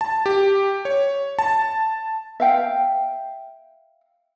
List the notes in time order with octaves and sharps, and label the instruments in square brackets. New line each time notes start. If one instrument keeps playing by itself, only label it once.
[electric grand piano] A5
G4
C#5
A5
[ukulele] E5 F5 G5